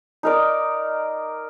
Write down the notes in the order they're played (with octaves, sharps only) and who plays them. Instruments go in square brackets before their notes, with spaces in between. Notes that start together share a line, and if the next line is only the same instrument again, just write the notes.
[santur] D#4 A#4 D5